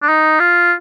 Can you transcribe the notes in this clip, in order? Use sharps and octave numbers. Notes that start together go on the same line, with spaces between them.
D4
D#4
F4